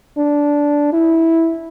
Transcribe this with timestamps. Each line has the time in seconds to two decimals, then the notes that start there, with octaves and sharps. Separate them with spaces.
0.17 D4
0.92 E4